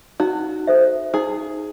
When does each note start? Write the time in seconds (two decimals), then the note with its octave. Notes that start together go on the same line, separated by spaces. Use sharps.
0.20 D#4 F#4
0.67 A4 C5 E5
1.14 D#4 G#4